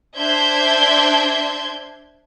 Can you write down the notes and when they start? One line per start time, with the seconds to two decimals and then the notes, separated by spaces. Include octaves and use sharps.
0.16 D4 C5 E5 C6 G6 G#6